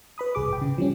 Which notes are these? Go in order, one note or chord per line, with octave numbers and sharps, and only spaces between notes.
B4 B5 D#6
C2 G#4 D6
G#1 G5
C#3
F3 G3 C#4